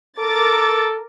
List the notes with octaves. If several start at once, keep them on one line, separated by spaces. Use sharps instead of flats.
A4 A#4 D6 A6